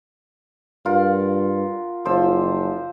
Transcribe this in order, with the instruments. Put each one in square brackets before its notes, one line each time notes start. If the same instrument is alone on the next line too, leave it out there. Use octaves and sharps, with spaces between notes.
[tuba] G2 [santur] F4 A#4 F#5
[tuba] F#1 [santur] F3 C5 E6